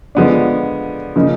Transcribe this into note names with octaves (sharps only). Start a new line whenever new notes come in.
D3 F3 G#3 B3 D4
C#3 F3 A#3 D#4